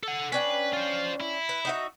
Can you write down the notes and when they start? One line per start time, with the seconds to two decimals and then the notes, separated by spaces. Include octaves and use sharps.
0.03 A4 F#5
0.32 C#4 D4 B4 G5
0.73 F4 C5
1.21 E4
1.49 B4
1.65 D#4 F#4 E5